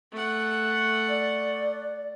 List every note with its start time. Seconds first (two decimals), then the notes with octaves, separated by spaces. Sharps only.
0.12 A3 F#5
1.09 D5